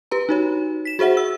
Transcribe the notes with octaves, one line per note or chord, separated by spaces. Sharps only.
G4 B4 A#5
D#4 F#4 C#5
B6 E7
F#4 G#4 C5 E5 F#5
E6